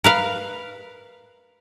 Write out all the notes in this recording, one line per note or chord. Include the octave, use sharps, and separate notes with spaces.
A#4 B4 F5